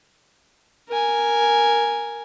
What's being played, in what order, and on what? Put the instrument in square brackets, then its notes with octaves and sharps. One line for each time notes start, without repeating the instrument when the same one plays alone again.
[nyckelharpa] A#4 G#5